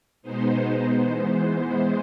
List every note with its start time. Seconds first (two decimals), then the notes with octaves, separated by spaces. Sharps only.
0.22 B2 G#3 B3 D#4 C5
1.02 E3 G#3 B3 C5